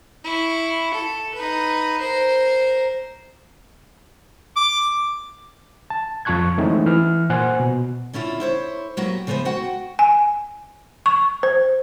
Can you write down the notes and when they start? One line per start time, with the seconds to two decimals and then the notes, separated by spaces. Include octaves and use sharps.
0.24 E4 C#6
0.94 A4
1.34 D#4 B4
2.00 A#4 C5
4.56 D6
5.90 A5
6.25 F2 F4 A5 C#6 F#6 G#6
6.58 E3 G#3 A3 C4 C#4 D#4
6.86 E3 F6
7.30 A#2 C5 F#5 G#5 F#6
7.60 B2
8.13 D3 C#4 E4 F4
8.40 E4 C5 C#5
8.97 F#3 A#3 B3 F#4 G4
9.27 C#3 F3 B3 C5 E5
9.45 F#4 F#5 G5
9.99 G#5
11.06 C#6
11.43 C5